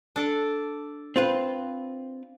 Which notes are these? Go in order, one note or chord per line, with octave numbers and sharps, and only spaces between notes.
D4 A4 D5
C4 F4 B4